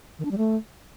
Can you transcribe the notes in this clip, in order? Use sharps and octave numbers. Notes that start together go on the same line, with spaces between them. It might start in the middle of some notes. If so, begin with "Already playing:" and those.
D#3
D4
G3
A3